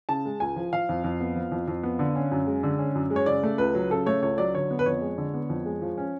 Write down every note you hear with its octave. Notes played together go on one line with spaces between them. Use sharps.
C#3 A5
G#3
C#2 G#5
F3
F3 F5
F2
F2
B3
F3
F2
F2
B3
D3
C#4
F#2
G#3
D3
C#4
F#2
G#3
C#5
C#3 D5
A3
C#2 B4
F#3
C#3 A4
A3 C#5
C#2 C#5
F#3 D5
D3 C#5
B3
B4
F2 C#5
G#3
D3
B3
F2
G#3
F3
C#4